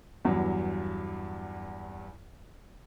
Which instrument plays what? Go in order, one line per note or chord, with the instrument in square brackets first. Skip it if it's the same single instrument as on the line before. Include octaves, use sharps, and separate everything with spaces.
[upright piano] E2 G2 F#3